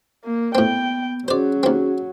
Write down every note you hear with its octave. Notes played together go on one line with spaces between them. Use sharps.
A#3
A2 B3 C4 G5
F#3 C#4 F#4 G#4 C5 D5
D#2 C4